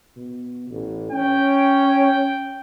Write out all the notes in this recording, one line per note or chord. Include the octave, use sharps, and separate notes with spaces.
B2
A1
C#4 G5